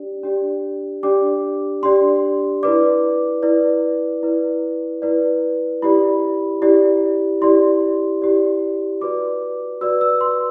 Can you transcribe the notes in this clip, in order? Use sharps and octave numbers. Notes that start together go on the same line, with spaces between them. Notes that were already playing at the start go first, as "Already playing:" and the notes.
Already playing: D4 G4 D5
D4 G4 D5
D4 G4 D5 D6
D4 G4 D5 C6
E4 B4 D5 D6
E4 B4 D5
E4 B4 D5
E4 B4 D5
E4 G4 D5 B5
E4 G4 D5
E4 G4 D5 C6
E4 G4 D5
F#4 B4 D5 D6
F#4 B4 D5 E6
E6
C6